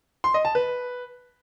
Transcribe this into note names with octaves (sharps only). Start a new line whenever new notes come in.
C6
D#5
A5
B4